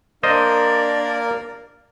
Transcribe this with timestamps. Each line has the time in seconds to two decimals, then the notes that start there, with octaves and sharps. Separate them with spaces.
0.23 A#3 D4 A#4 C5 D5 D#5